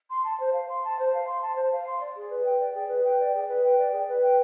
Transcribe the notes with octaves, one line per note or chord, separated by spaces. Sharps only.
C6
A5
C5
F5
C6
A5
C5
F5
C6
A5
C5
F5
C6
D5
G#4
B4
G5
D5
G#4
B4
G5
D5
G#4
B4
G5
D5
G#4
B4
G5